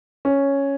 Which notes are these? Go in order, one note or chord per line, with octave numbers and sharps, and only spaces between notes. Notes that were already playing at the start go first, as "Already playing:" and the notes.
C#4